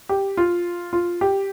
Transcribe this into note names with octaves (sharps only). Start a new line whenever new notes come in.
G4
F4
F4
G4